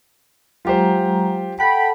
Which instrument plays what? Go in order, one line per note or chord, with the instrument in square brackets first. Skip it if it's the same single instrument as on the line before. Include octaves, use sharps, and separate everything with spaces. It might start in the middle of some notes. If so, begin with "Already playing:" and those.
[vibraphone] F#3 G#3 A#5 [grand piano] F4 G4 C5
[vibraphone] A4 F#5 A5 [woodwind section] G5 B5